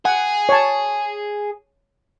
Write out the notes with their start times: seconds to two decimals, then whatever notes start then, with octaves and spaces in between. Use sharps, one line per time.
0.05 G#4 F#5
0.49 C#5 A5